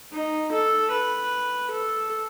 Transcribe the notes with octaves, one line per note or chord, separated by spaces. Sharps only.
D#4
A4
B4
A4